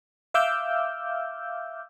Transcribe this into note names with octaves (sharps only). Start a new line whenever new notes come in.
E5 F5 D6 E6 F6 G6